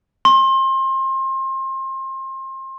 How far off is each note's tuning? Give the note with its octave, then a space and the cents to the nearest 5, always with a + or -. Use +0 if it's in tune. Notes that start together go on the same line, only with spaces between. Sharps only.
C6 +30